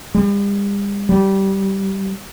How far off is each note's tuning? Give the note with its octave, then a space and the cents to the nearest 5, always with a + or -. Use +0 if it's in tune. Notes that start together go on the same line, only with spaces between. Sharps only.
G3 +45
G3 -15